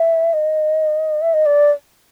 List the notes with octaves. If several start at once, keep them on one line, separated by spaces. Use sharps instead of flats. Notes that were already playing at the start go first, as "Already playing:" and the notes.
Already playing: E5
D#5
E5
D#5
D5